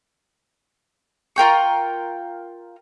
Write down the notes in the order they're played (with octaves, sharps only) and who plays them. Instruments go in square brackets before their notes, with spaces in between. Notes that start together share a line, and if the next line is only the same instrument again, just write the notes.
[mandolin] F4 A#4 G5 C#6